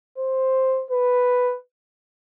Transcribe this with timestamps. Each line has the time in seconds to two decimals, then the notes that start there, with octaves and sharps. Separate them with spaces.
0.18 C5
0.91 B4